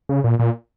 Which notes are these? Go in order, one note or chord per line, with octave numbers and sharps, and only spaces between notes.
C#3
A#2
A#2